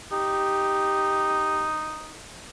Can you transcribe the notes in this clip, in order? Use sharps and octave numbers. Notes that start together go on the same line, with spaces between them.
D#4 G4